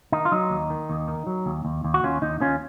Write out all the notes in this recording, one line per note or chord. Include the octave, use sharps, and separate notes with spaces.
D#3 D#4
F4
F#3 D#4
D#2
D#3
D#2
D#3
F#3
D#2
D#2
D#2
F#4
D#2 C#4 F4
D#2 D#4
D#2 C#4 F4